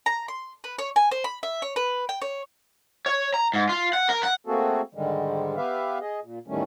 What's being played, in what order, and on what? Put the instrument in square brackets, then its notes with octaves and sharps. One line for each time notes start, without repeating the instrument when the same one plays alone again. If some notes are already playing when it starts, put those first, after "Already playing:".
[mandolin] A#5
C6
B4
C#5
G#5
C5
B5
E5
C#5
B4
G5
C#5
[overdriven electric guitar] C#5
A#5
G#2
F4
F#5
A#4
F#5
[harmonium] A3 A#3 C4 F#4 G#4 A4
G#2 D3 D#3 G3 G#3
B3 G4 B4 E5 F5
G#4 D#5
A#2
E2 A2 D#3 G3 A3 C#4